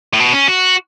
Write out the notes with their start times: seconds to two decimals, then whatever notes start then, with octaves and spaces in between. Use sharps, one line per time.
0.13 A2
0.19 B2
0.33 C#4
0.47 F#4